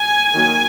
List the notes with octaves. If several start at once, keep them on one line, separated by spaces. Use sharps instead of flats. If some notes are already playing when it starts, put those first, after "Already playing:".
Already playing: G#5
D#3 F#3 A#3